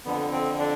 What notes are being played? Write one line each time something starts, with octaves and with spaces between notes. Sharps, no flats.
F2 D3 B3
C4
D4